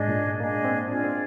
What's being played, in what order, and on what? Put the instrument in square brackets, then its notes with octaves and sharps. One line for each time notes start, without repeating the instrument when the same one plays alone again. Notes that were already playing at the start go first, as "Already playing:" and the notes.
Already playing: [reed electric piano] G#2 [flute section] D4 G#4 D#5
[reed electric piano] A#2
[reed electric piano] A#3 [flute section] D4 G#4 D#5
[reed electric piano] C4
[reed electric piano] D4 [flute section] F4 G#4 D5
[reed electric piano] C4